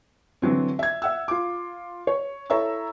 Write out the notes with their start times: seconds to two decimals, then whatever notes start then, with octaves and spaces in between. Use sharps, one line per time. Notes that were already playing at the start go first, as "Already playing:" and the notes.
0.42 D3 E3 F#3 C4
0.79 E5 G#6
1.02 E5 F#5 E6
1.28 F4 D6
2.07 C#5
2.50 E4 A4 C#5 E5 A#5 E6